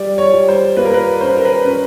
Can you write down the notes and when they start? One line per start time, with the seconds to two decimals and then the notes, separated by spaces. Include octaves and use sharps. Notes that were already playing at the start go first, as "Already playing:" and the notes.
Already playing: G3 D5
0.18 C#5
0.33 G3
0.49 C5
0.77 A#3 B4
0.85 A#4
0.94 B4
1.21 C#4 C5
1.30 B4
1.37 A#4
1.45 B4
1.65 C#4 B4